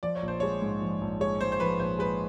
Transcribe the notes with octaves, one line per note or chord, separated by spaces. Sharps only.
F3 D5
C#5
A#1
C5
G#3 C#5
G#2
F3
A#1
G#3 C#5
G#2 C5
C5
F3 B4
A#1 C5
G#3 B4